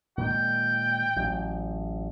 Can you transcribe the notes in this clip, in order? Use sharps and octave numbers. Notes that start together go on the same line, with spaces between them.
A#2 D#3 G#3 G5
A1 F#3